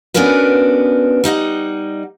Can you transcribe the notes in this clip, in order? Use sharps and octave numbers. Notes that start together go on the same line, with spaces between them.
B3 C#4 D4 F#4 A#4 B4
G3 D#4 D#5 F#5